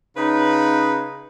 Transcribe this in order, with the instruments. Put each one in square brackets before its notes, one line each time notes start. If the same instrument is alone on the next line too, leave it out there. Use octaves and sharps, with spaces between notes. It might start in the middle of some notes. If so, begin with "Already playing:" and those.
[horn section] C#3 B4 [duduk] D#4